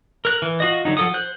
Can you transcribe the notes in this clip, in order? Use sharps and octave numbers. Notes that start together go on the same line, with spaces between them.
A#4 F#6
E3
F4 F#4 D#5
D3 F#3 D#4
F3 F#3 A4 F#5 D#6
C5 F#6